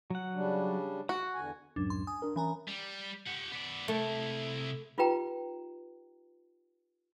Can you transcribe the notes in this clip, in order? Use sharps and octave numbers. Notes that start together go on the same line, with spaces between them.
F#3 F#5
C#3 G3 D4
F#4 F#5
E2 D3 G#5
C#2 F#2 A2 D4
C6
G#5 D#6
D4 A#4
E3 C#4 A#4 G#5 A#5
G3
G4 F#5
B3 D5
C3 A3 E4
D#4 F4 G4 B4 G5 A#5